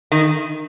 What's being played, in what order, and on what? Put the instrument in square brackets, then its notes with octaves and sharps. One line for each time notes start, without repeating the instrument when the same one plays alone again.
[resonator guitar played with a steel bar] D#3